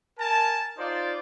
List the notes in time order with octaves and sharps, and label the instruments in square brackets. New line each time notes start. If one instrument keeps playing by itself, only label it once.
[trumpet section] A#4 G#5 A5
D#4 F4 C5 D5 D6